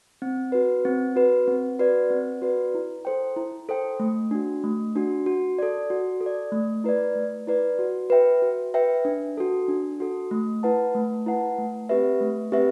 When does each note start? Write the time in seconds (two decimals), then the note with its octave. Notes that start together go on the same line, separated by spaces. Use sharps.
0.22 C4
0.52 F#4 B4
0.85 C4
1.16 F#4 B4
1.48 C4
1.79 F#4 B4 D5
2.10 C4
2.42 F#4 B4 D5
2.74 E4
3.05 A4 C5 G5
3.36 E4
3.69 A4 C5 G5
4.00 A3
4.31 D4 F#4
4.64 A3
4.95 D4 F#4
5.26 F#4
5.59 A4 D5
5.90 F#4
6.21 A4
6.26 D5
6.52 A3
6.84 E4 B4 D5
7.15 A3
7.47 E4 B4 D5
7.79 F#4
8.10 B4 E5 G5
8.42 F#4
8.74 B4 E5 G5
9.05 D4
9.37 F#4 A4
9.68 D4
10.00 F#4 A4
10.31 A3
10.63 E4 B4 F#5 A5
10.95 A3
11.26 E4 B4 F#5 A5
11.58 A3
11.89 C4 G4 B4 E5
12.21 A3
12.52 C4 G4 B4 E5